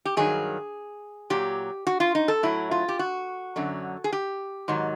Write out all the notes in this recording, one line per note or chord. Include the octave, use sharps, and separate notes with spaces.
G4
G2 D#3 F#3 G#4
A#2 F#3 G4
F#4
F4
D#4
A4
A2 F#3 E4
F4
G4
F#4
F#2 D3 F#3
G#4
G4
G#2 D#3 F#3